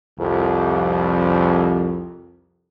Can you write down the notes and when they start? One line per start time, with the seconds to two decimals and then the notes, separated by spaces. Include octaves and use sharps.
0.19 C2 F2